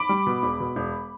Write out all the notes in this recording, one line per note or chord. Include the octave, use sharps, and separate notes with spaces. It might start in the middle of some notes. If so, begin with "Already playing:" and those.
Already playing: B5 D6
G3
B2
E1
B2
E1